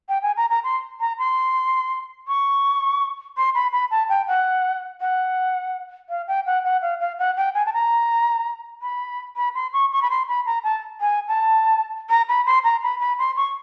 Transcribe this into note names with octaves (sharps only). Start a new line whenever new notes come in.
G5
G#5
A#5
A#5
C6
A#5
C6
C#6
C6
B5
B5
A5
G5
F#5
F#5
F5
G5
F#5
F#5
F5
F5
F#5
G5
G#5
A5
A#5
B5
B5
C6
C#6
C#6
B5
C6
B5
A#5
A5
G#5
A5
A#5
B5
C6
A#5
B5
B5
C6
C#6